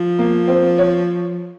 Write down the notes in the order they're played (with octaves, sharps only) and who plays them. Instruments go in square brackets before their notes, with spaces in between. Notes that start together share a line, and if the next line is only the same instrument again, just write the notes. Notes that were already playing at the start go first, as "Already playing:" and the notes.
Already playing: [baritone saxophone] F3
[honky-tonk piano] A#3
C4
C#5